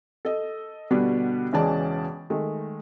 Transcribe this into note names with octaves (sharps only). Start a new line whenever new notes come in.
A4 D#5
B2 D3 G3 B3 D4
E1 C#3 E3 G#3 D5 A5
D#3 G#3 A3